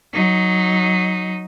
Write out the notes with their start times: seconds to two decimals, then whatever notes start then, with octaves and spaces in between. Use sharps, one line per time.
0.14 F#3 D#4